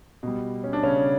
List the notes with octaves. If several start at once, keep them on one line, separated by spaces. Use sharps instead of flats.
B2 G3
C#4
D4
C#3 C#4